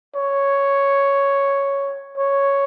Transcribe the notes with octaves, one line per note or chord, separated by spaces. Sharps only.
C#5
C#5